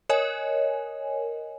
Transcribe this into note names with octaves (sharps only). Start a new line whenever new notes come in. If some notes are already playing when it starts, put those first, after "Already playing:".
A#4 C#5 D#5 G#5